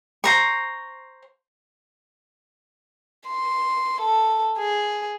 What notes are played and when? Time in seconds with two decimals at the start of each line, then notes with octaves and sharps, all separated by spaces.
0.24 C5 A#5 C#6
3.27 C6
4.01 A4
4.58 G#4